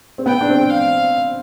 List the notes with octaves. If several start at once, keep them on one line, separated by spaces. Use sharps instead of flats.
C4
B3 G5
D4
C4
D4
F5